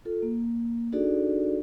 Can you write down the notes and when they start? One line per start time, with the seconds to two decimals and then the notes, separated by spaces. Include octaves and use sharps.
0.05 F4 A4
0.22 A#3
0.92 D4 D#4 F#4 G#4 A4 D5